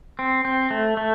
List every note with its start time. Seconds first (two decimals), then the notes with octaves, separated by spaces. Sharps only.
0.19 C4
0.45 C4
0.71 A3
0.97 A3